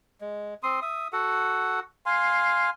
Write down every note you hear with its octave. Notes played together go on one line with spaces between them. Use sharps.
G#3
C4 C6 D#6
E5 D#6
F#4 A4 F#5
F5 G#5 C6